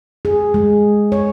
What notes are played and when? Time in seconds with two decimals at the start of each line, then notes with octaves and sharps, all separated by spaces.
0.25 G#4
0.54 G#3
1.12 C#5